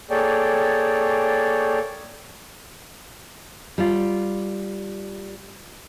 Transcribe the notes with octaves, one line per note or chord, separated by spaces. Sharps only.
A#3 G#4 A4 C#5 D5 G5
G3 F4